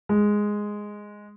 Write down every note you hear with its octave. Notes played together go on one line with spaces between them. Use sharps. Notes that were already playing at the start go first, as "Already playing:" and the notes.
G#3